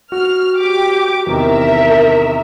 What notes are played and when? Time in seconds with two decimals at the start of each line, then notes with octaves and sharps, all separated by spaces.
0.12 F#4 F6
0.59 G4 D6
1.27 E2 C3 D#3 A#4 E5